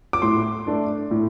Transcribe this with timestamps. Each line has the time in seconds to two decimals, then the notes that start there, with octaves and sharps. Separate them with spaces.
0.13 D6
0.22 A2 C6
0.67 A3 D4
1.11 A2